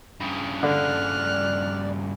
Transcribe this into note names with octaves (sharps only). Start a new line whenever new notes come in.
G2 C#3
D3 D5 F6 F#6